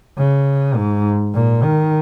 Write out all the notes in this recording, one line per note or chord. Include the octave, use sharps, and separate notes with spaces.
C#3
G#2
A#2
D#3